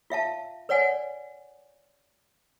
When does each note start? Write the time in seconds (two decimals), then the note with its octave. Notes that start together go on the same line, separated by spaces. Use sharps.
0.10 F4 E5 F5 A5
0.69 B4 C#5 D5 F#5 G#5